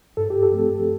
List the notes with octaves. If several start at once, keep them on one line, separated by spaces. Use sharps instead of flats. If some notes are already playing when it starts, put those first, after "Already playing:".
G2 A4
G4
A4
F3 A3 C4